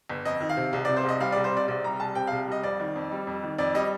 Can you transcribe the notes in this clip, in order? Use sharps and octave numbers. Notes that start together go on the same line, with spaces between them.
G1
F2 D#5
D#3
F5
C3
C2
C3 D5
C5
C2 D#5
G3 F5
C2 D5
C5
C3 D5
C2 D5
G3 A#5
C2 A5
C3 G5
C2 F5
G3 D#5
F2 D5
D#3
F2
G3
F2
D#3
F2 D5
G3 D#5